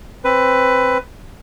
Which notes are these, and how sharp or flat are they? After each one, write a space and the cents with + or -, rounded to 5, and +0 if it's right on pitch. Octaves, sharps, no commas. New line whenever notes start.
C4 +15 B4 +15